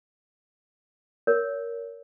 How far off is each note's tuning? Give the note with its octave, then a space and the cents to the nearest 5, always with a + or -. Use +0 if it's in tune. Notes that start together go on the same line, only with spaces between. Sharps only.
A#4 +0 C#5 +25